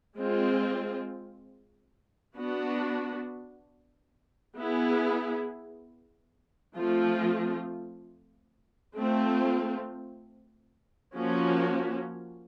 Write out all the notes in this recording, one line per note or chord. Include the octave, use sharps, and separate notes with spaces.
G#3 C4 F4
B3 D4 F#4
B3 E4 G#4
F3 A3 C4 F4
A3 C4 F4
F3 A#3 C#4 F#4